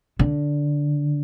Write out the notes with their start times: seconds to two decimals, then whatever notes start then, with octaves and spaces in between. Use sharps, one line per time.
0.19 D3